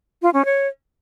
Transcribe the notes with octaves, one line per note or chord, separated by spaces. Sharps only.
F4
C#4
C#5